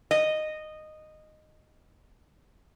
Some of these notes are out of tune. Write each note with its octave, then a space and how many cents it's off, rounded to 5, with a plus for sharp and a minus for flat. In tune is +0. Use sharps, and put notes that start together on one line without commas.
D#5 -10